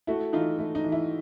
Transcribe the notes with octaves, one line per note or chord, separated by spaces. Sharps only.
A3 E4 F#4
E3 D#4 F4
A3 E4
D#4
E3
E4